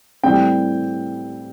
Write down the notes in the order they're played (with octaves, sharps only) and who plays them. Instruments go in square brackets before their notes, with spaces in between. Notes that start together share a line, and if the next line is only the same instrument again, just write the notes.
[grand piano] A2 G3 C4 G5